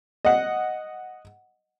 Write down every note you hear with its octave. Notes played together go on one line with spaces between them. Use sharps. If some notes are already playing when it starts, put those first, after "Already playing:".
D#5 F#5